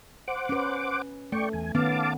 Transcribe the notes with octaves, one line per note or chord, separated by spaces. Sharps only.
C5 F#5 D6
C#4 B4
A3 D5 G5 C#6
E2 G#5
D#3 B3 C#4 F5 A5 D6